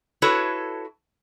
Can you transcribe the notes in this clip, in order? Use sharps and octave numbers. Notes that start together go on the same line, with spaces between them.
E4 F#4 A4 B4 C#5